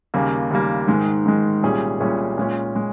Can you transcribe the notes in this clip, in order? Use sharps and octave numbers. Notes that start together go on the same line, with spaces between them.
D#2 C#3 G3 A#3
D#2 C#3 G3 A#3
G#2 D#3 G#3
G#2 D#3 G#3
C2 A#2 G3 C#4 G#4
C2 A#2 G3 C#4 G#4
A#2 G#3 C#4
A#2 G#3